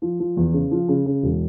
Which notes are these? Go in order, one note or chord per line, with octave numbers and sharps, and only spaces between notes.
F3
F3
E2
C#3
F3
C#3
C#3
E1